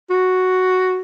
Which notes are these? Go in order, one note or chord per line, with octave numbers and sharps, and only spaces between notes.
F#4